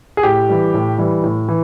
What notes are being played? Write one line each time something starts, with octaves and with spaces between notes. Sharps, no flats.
G#4
A2 G4
E3 G3
A2
E3 G3
A2
E3